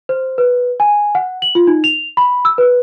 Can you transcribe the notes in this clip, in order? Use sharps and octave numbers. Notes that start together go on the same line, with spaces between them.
C5
B4
G#5
F#5
F#7
F4
D#4
F7
B5
E6
B4